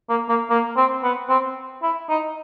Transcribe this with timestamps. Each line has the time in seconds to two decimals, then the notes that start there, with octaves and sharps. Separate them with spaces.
0.09 A#3
0.29 A#3
0.50 A#3
0.77 C4
1.04 B3
1.29 C4
1.83 E4
2.10 D#4